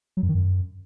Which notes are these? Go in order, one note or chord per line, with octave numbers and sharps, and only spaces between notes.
F#3
F#2
D#3
F#2